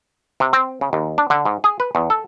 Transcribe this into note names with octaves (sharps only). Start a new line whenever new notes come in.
C3
C4
C#3
D#2
D4
D3
G#2
G#4
B4
E2
A4